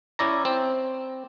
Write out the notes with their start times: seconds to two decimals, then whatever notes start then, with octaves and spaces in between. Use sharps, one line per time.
0.19 C#4 E4 D5 A#5
0.45 C4